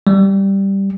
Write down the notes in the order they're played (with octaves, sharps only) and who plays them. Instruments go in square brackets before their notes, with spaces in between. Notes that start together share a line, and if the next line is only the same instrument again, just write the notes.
[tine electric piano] G3